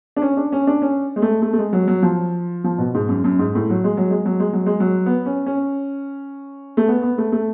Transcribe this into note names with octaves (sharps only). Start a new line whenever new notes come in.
D4
C#4
D4
C#4
D4
C#4
G#3
A3
A3
A3
G#3
F#3
F#3
F3
F3
B2
G#2
F#2
F#2
G#2
A2
F#3
G#3
F#3
G#3
F#3
G#3
F#3
G#3
F#3
B3
C#4
C#4
A3
B3
B3
A3
A3